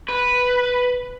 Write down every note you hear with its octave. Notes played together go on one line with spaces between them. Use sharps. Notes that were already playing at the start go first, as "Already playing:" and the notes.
B4